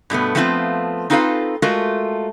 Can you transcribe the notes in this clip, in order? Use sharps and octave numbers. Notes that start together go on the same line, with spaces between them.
G2 B2 A3 B3
F3 A3 B3 C4 D#4 F4
C4 D#4 F4 A4 B4 F5
G#3 A3 F4 F#4 A#4